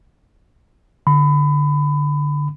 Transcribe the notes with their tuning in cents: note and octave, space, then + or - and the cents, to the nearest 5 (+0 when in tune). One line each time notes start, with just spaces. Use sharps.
D3 +0 B5 +25